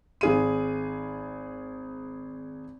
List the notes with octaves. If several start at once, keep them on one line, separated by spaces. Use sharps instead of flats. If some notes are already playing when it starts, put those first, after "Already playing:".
G#1 G#4 D#7